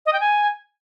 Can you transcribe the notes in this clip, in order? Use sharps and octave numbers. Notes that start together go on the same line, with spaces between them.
D#5
G5
G#5